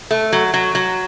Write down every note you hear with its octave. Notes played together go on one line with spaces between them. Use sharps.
A3
F#3
F#3
F#3